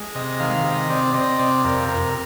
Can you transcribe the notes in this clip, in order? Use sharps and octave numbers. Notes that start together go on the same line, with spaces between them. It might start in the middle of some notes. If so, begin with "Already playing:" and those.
Already playing: G#3
C3 D#5
D#3 F5
C3 D#5
C4 D5
C4 D#5
C3 D5
F2 A#4
C3 A#4